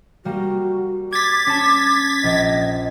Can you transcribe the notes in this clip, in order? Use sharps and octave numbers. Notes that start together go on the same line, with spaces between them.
G3 A#3 F#4
D6 G#6 A6 B6
C#4 A5
A#1 D#5